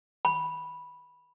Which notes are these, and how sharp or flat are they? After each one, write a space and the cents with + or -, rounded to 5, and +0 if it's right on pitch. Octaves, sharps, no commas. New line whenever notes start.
B5 -5